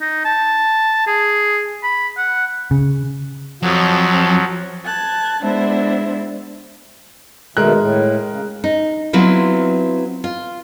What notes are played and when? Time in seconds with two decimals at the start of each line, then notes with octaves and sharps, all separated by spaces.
0.01 D#4
0.25 A5
1.07 G#4
1.83 B5
2.17 F#5
2.71 C#3
3.63 F2 F3 F#3
4.84 A5 F#6 G#6 A6
5.41 G#3 B3 D4 E4 C5 E5
7.57 B2 D#3 G#3 A3 A#4 F#6
7.79 A2
8.28 C#3
8.64 D#4
9.13 F#3 B3 C4 E4 F4
10.24 F4